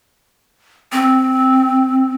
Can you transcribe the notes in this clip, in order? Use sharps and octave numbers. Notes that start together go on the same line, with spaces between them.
C4